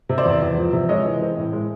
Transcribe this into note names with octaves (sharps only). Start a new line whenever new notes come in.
C3
C5 D5
E2
E2
F3
C3
G#3 C#5 D#5
E3
C4
A2
G#3